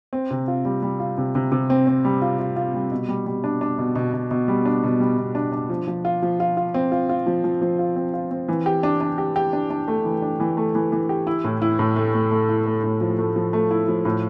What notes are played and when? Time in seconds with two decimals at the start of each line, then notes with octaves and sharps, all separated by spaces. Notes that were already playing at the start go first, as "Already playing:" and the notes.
0.13 C4
0.31 C3
0.48 F4
0.65 G3
0.82 G3
1.00 F4
1.18 C3
1.35 C3
1.52 C3
1.70 C4
1.87 C4
2.05 G3
2.22 F4
2.39 F4
2.56 F4
2.74 G3
2.91 B2
3.09 G3
3.26 G3
3.44 D4
3.61 D4
3.78 B2
3.95 B2
4.13 B2
4.31 B2
4.48 G3
4.65 D4
4.83 B2
5.00 G3
5.18 B2
5.35 D4
5.52 D4
5.70 F3
5.87 F3
6.05 F4
6.22 F3
6.40 F4
6.57 F4
6.74 C4
6.92 F4
7.09 F4
7.26 F3
7.44 F3
7.62 F3
7.79 F4
7.96 C4
8.14 F4
8.31 C4
8.48 E3
8.66 G4
8.83 D4
9.01 D4
9.18 G4
9.36 G4
9.53 D4
9.70 D4
9.88 A3
10.05 E3
10.22 D4
10.40 E3
10.57 A3
10.75 E3
10.92 E3
11.09 G4
11.27 E4
11.44 A2
11.62 E4
11.79 A2
11.96 A3
12.14 A3
12.31 A3
12.49 E4
12.66 A3
12.84 A2
13.01 F3
13.19 A3
13.36 F3
13.53 A3
13.71 E4
13.88 F3
14.05 A2